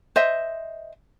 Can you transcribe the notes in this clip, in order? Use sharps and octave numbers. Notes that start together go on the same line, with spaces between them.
C5 D#5 E5